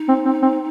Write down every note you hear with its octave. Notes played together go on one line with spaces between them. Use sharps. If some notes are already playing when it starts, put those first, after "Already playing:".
Already playing: D#4
C4
C4
C4